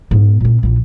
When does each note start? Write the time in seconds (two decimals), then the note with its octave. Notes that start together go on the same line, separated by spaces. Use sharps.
0.11 G#2 B3
0.40 A#2 C4
0.63 A#1 E3